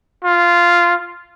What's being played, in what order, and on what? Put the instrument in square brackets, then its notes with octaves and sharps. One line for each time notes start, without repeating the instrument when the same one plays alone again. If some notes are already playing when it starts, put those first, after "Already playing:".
[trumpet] F4